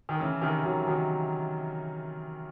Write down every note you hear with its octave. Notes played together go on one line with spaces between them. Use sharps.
D#3
C#3 E3
C3 D#3
D#3 F#3
D#3 F#3